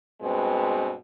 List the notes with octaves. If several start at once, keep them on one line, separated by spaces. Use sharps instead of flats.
G2 B2 G#3 C4